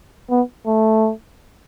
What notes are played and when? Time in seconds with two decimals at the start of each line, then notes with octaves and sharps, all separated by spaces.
0.30 B3
0.66 A3